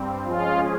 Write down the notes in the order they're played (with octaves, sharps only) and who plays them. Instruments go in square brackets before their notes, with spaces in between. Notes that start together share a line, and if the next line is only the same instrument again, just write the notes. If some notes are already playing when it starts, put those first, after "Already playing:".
Already playing: [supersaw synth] G2 G3 C4
[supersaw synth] F3 G#3 C#4 G#4 [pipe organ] F4